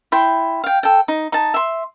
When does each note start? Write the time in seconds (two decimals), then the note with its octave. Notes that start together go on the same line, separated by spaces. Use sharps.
0.12 E4 G5 C6
0.64 F5 G5
0.83 A4 G5
1.08 D#4
1.32 D#4 A5
1.54 E5 C6